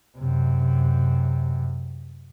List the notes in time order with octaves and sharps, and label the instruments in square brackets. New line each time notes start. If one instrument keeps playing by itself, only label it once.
[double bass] F#2 C3